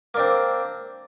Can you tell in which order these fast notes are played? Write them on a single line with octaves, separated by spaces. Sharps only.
A#3 D4 C4